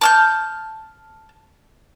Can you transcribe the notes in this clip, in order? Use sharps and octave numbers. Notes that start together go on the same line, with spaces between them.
A5 F6 G6